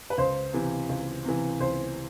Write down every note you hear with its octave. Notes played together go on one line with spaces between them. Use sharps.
B4
C#2 C5
C3 E3
C#2
C3 E3
C#2 C5